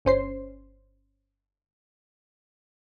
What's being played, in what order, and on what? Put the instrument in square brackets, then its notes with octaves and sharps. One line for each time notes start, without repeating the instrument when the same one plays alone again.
[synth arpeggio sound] G1 C#4 C5 C7